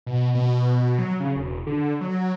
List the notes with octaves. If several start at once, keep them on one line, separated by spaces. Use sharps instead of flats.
B2
B2
B2
F#3
C#3
E1
D3
F#3